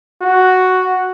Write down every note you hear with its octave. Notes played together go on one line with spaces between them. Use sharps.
F#4